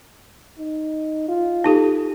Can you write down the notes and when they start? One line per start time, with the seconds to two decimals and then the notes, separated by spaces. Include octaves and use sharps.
0.59 D#4
1.29 F4
1.64 D#4 G4 A4